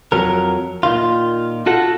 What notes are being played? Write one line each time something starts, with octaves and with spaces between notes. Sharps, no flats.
F2 F#3 A#4
A#2 D#3 F4
F4 F#4 A4 F#5